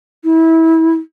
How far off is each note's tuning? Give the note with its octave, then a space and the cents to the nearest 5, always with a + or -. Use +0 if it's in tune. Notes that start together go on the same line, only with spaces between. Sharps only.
E4 -25